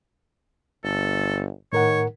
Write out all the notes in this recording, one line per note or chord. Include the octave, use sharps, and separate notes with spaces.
G1 A4
A2 D#3 A#4 C#5 F#5